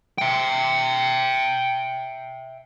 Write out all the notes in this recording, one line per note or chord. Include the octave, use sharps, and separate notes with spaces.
E5 G5